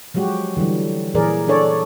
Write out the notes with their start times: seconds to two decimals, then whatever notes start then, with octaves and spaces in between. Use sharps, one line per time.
0.14 F3 F#3 G#3 F#4 G4
0.57 D3 E3 F#3 G3
1.14 A#2 E3 G#4 A#4 D5
1.48 D4 A4 C#5 D5